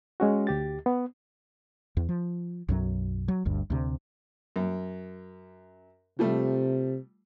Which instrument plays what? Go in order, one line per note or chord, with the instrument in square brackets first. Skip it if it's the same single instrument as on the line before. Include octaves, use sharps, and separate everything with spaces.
[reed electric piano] G#3 C#4 F#4
D2 G4 A6
B3
[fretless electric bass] E2
F3
B1 F#2 F#3
F#3
G1 D2 G2
D2 C3
[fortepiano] F#2
[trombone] C3 [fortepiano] F3 G3 A3